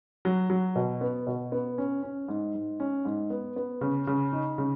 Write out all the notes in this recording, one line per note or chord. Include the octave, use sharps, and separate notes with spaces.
F#3
F#3
B2
B3
B2
B3
C#4
C#4
G#2
G#2
C#4
G#2
B3
B3
C#3
C#3
D#4
C#3